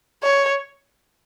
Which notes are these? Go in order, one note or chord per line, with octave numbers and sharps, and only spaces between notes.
C#5